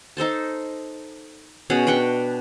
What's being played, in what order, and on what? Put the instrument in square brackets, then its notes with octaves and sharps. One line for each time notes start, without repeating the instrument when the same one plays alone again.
[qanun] D#4 A4 C5 A5
B2 C#4 G#4 F#5
D4 B4 G5 C#6